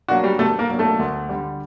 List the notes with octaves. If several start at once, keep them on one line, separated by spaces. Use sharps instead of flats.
F#3 A#3 D4 F#4
G3 G4
C3 A3 A4
A#3 A#4
F#3 A#3 D4
A3 A4
D2
D3 G3